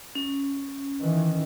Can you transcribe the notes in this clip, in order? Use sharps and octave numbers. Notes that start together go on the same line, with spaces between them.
C#4
D#3 E3